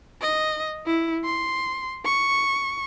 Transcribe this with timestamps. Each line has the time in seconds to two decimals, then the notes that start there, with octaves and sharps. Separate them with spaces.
0.21 D#5
0.86 E4
1.24 C6
2.05 C#6